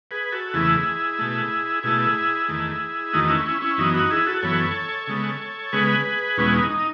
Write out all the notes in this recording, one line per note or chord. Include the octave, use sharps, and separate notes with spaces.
G#4 B4
F#4 A4
E2 C#3 E3 A3 E4 G#4
B2 A3
B2 A3 E4 G#4
E2 D#3 A3
E2 D#3 A3 D#4 F#4
C#4 E4
C#4 E4
C#4 E4
F#2 E3 B3 D#4
D#4 F#4
E4 G#4
F#4 A4
F#2 E3 B3 A4 C#5
C#3 G#3 B3
C#3 G#3 B3 G#4 B4
E2 B2 G#3 B3 C#4
D#4
D#4